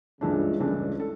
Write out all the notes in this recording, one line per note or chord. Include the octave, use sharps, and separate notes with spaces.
C#2 G2 C#3 E3 A3 D4
C#2 G2 C#3 E3 A3 D4
A4